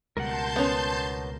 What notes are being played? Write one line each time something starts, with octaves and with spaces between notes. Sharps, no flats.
C#2 B2 G3 A#4 F#5 A5 C6 G6
B3 C#4